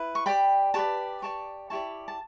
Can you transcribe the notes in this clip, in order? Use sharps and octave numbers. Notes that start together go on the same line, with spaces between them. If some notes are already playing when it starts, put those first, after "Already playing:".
Already playing: E4 B4
C#6
G4 D5 G5 B5
G4 B4 D5 A5 C#6
G4 D5 A5 C#6
E4 G4 D5 A5 C#6
A5